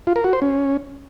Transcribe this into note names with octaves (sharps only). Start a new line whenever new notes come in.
F4
A#4
F#4
C5
C#4